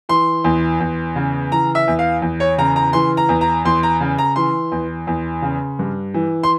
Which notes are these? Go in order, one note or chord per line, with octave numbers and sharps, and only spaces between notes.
E3 C6
E2
E2
C#3
E3 A#5
E5
E2
F5
E2
C#5
C#3 A#5
A#5
E3 C6
A#5
E2
A#5
E2 C6
A#5
C#3
A#5
E3 C6
E2
E2
C#3
G2
E3
C6